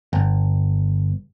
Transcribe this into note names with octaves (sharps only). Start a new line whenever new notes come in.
G1